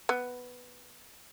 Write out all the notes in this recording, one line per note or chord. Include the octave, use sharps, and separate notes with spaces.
B3